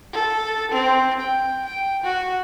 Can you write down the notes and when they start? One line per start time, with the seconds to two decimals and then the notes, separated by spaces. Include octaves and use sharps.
0.13 A4
0.72 C4
1.20 G5
1.65 G5
2.04 F#4